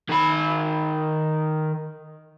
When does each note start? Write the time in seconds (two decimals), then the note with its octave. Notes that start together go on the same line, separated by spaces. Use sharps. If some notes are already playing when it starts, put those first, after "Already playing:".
0.09 D#3 B5